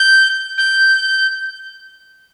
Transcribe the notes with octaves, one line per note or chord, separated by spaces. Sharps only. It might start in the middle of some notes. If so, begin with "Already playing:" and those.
Already playing: G6
G6